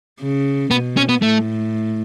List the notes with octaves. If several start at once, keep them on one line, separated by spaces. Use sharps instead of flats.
C#3
B2 B3
C#4
B3
A2 A3